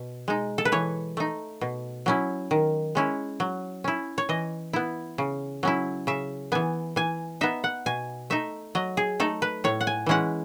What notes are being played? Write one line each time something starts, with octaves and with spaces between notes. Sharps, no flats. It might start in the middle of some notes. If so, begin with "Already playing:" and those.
Already playing: B2
G#3 D#4
A4
B4
E3 C#5
A3 D#4
B2
F#3 C#4 E4
D#3
G#3 C#4 E4
F#3
C#4 E4
C#5
E3 D#5
B3 E4
C#3
F#3 C#4 E4
C#3 E5
E3 B3 G#5
E3 G#5
B3 D#4 E5
F#5
B2 G#5
A3 D#4 E5
F#3 D#5
G#4
A3 D#4 A4
B4
A2 C#5
F#5
G#5
E3 G#3 C#4 E4 F#5